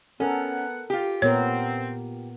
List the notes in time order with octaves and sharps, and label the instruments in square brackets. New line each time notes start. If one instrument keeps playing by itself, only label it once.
[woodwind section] B3 F#5 [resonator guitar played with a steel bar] C#4 [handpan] A4 A#4
[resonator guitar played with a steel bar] F4 G4
[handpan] A#2 B3 A#4 [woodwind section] C4 [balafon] C#5